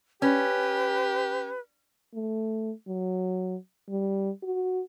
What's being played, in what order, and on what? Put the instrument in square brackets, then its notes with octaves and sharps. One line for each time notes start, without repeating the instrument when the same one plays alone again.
[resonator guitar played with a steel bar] C#4 [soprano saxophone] G4 [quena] B4
[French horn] A3
F#3
G3
F#4